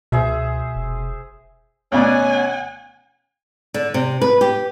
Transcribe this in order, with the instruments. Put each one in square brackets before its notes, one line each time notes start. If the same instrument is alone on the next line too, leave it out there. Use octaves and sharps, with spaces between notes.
[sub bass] C#2 [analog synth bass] B2 [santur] G#4 C5 E5
[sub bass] F1
[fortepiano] D2 B2 D5 [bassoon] C#4 [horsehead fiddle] F#5 G#5
[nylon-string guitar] D3
C3
B4
G4